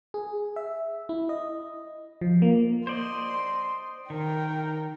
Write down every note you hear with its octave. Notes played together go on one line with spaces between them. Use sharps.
G#4
E5
E4
D#5
F3
A#3
C5 D5 D#5 C6
D#3 A#4 G5